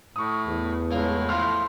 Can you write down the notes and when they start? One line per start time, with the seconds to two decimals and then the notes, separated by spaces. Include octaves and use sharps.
0.16 A2 C#6 D#6
0.47 E2
0.91 C#2 A2 A#3 F4
1.29 F3 A3 F4 F5 C6 F6